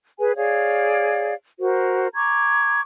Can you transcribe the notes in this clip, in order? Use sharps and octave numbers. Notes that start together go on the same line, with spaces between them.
G#4 B4 G#5
G#4 C#5 D5 F5
F#4 A#4 C5
A#5 C#6 D6 G#6